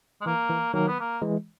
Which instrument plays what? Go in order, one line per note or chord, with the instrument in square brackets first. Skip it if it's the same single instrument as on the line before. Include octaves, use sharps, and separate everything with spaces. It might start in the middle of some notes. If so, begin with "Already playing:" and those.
[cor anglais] G#3
[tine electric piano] E3 [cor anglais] A#3
[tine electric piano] E3
[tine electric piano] D#3 F#3 [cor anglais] A#3
[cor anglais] B3
A#3
[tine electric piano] E3 G#3